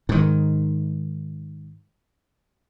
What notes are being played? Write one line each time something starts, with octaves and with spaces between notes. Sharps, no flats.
G#2 D#3